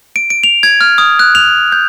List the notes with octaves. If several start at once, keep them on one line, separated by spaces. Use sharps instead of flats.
D7
D7
F7
G#6
F6
D#6
F#6
F7
G6